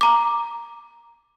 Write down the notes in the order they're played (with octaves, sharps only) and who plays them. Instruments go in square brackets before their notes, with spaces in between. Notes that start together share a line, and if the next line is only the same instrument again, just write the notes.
[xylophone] A#5 D6